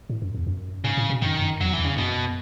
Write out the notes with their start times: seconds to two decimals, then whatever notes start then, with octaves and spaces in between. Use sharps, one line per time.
0.10 A2
0.22 F#2
0.35 E2
0.47 F#2
0.84 G#2 C#3
0.97 A2
1.10 B2
1.22 F#2 D#3
1.41 F#2
1.61 E2 F#3
1.73 E3
1.79 E2
1.85 C#3
1.97 F#2 B2